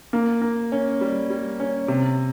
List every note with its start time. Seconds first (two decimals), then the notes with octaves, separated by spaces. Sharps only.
0.13 A#3
0.42 A#3
0.72 C#4
1.01 G3
1.30 G3
1.60 C#4
1.88 C3